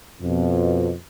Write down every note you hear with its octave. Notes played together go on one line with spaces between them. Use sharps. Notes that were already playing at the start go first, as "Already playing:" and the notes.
F2 B2